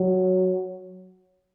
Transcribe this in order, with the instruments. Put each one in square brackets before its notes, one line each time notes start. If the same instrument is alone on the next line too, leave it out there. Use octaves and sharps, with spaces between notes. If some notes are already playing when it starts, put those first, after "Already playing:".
Already playing: [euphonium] F#3